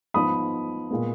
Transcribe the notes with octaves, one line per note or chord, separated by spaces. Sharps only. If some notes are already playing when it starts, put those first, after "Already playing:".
G#2 F3 B3 D#4 B5 D#6
A#2 G#3 B3